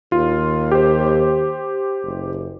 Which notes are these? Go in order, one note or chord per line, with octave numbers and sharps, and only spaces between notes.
D#2 F4
G4 C5
F#1